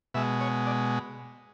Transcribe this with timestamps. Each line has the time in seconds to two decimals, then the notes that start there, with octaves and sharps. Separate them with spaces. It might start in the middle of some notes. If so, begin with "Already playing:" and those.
0.14 B2 G#3 E5
0.40 C#5
0.67 D5